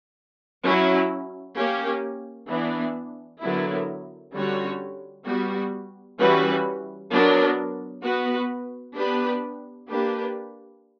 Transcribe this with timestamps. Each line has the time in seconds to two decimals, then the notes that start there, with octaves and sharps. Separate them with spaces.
0.64 F#3 C#4 E4
1.57 A#3 C#4 G4
2.49 E3 B3 D4
3.42 D3 F#3 B3 E4 A#4
4.34 D3 G3 C#4 F#4 C#5
5.26 G3 B3 F#4
6.18 E3 G3 C#4 F#4 B4
7.11 F#3 B3 D4 A#4
8.03 B3 F#4 B4
8.95 B3 D4 G4 B4
9.87 A#3 D4 G4 B4